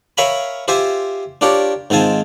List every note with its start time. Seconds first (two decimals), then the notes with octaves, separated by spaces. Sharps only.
0.17 A#4 C#5 E5 F5 G#5 B5
0.68 F4 G4 C5 E5 G#5
1.41 D4 F4 G4 A#4 C#5
1.90 G#2 D#3 C4 F4 G#5 A5